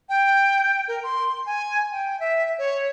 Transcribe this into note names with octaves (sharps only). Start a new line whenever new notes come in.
G5
A#4
C6
G#5
G5
E5
C#5